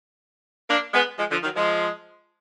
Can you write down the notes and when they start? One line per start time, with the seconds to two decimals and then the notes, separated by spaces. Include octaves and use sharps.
0.69 A#3 D4
0.94 G#3 B3
1.19 F3 G#3
1.31 D3 F3
1.43 D#3 F#3
1.56 F3 G#3